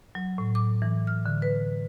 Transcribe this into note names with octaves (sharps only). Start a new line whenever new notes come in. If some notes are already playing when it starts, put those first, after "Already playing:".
F#3
A2
D6
E3
F6
D3
B4